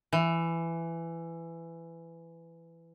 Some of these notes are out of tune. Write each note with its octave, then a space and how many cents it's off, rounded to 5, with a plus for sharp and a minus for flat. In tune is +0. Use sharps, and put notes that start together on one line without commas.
E3 +15